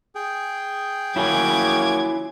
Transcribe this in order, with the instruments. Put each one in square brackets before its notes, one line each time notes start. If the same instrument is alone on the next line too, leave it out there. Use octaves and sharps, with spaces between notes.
[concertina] G#4 G5
[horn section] F#3 A#3 C#4 [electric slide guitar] E4 F4 G#5 [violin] D6 G#6